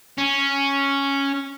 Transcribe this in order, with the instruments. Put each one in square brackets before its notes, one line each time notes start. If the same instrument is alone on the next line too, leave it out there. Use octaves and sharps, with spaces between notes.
[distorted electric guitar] C#4